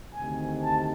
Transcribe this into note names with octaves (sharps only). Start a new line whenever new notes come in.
D2 C3 D#3 G#5
A5